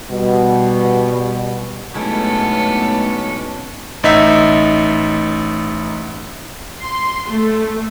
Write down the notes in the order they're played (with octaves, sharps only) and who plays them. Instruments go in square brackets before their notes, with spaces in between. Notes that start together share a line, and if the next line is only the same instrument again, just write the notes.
[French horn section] B2 G3
[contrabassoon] B1 [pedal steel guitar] G#3 A3 E4 [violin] B3 A4 [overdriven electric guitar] C#4 D4
[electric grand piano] A1 D#4 E5
[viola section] C6
A3